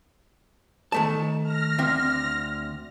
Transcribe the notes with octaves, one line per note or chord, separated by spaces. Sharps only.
D#3 A3 A5
F6 A#6
D2 C4 E5